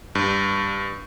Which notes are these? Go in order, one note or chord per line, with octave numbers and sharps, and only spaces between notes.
G2